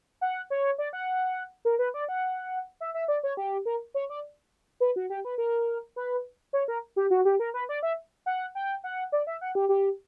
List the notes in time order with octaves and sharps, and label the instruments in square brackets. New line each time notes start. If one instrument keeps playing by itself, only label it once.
[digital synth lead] F#5
C#5
D5
F#5
A#4
B4
D5
F#5
E5
E5
D5
C#5
G4
A#4
C#5
D5
B4
F#4
G4
B4
A#4
B4
C#5
A#4
G4
F#4
G4
A#4
B4
D5
E5
F#5
G5
F#5
D5
E5
F#5
G4
G4